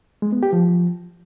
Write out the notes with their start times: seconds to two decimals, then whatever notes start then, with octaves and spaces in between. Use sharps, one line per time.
0.22 G#3
0.32 B3
0.43 G4
0.53 F3